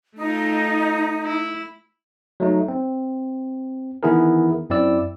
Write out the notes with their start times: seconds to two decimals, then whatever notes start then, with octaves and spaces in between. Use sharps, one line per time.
0.17 A3 D#4 F4
1.23 E4
2.40 F#3 A3 D#4
2.68 C4
4.03 D#3 E3 B3 E4 G#4 A#4
4.70 F#2 C4 E4 D5 E6